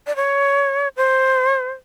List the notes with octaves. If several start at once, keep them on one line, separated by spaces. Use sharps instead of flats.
D5
C#5
C5